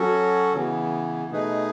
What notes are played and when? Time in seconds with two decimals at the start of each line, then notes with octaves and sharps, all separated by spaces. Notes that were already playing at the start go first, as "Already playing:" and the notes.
Already playing: F#3 C#4 F#4 A4
0.53 C#3 E3 B3
1.31 B2 A3 D#4 G#4 B4